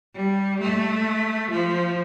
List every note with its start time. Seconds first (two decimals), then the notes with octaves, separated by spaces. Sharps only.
0.15 G3
0.60 A3
1.51 F3